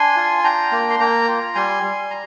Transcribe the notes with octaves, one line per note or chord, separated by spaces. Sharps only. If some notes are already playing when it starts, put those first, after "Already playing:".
Already playing: D4 G#5 C6
F4
D4 G5 A#5
A#3
C6
A#3 G5 A#5
F4
G3 G#5 C6
G3
A#5